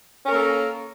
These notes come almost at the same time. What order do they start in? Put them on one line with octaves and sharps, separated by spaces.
C#4 A#4 A#3 A4